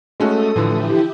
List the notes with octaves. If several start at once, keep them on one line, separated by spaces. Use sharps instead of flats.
G#3 A3 C#4 F#4 A4 D#6
A2 D3 E3 F3 E4 G4